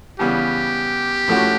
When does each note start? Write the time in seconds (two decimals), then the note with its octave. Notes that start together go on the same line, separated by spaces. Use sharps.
0.19 C#3 E3 G3 B3 G4
1.28 A2 F3 A3 C#4 F#4